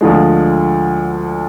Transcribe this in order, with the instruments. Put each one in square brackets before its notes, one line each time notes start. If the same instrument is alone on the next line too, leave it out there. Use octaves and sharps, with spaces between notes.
[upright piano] D2 D3 F3 G#3